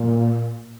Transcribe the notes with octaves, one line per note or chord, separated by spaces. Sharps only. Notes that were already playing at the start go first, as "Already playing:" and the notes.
Already playing: A#2